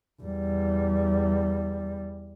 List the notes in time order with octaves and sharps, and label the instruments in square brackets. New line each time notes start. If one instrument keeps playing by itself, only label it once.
[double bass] E2 G3